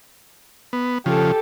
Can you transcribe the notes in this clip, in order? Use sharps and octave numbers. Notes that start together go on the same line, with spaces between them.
B3
C#3 F3 G4 A4